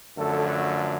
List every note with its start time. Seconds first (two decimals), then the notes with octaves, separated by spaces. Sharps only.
0.17 F#2 D3 F3 A3 A4
0.46 F#4